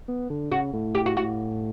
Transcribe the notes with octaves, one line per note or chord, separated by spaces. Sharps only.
B3
D3
C#3 F#4
A2
G4
F#4
F#4